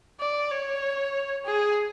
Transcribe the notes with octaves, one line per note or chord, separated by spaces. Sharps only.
D5
C#5
G#4